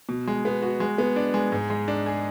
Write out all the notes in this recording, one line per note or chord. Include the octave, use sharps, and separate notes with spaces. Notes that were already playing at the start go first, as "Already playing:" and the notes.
B2
G#3
B3
F#4
G#3
B3
D4
G#3
G#2
G#3
D4
G#4